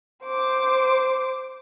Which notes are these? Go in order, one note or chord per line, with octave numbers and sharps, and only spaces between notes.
C5 D6